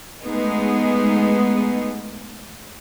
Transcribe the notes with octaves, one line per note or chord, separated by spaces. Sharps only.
G#3 A3 B3 D#4 G#4